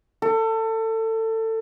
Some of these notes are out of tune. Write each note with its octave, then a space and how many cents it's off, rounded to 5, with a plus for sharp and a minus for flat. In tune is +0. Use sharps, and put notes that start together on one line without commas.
A4 +25